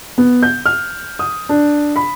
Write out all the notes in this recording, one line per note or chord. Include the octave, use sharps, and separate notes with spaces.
B3
G6
F6
D#6
D4
B5